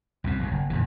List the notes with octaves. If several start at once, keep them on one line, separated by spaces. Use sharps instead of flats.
C2 F#2 C3
F1 B1 G2
F#1
E2 A#2 D#3 E3